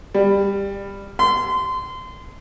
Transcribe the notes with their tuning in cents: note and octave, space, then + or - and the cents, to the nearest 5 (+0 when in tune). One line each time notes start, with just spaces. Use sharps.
G3 +15
C6 -25